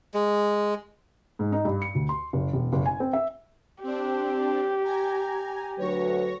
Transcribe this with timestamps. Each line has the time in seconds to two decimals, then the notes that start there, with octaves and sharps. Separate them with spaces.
0.14 G#3
1.39 G#2
1.52 D#4
1.65 G2
1.82 C#7
1.95 D2
2.09 C6
2.33 F#1
2.53 E1
2.73 F#1
2.86 G#5
3.00 C4
3.13 E5
3.83 C4 D4 G4
4.84 G#5 A#5
5.79 D2 F#3 B4 C#5 A#6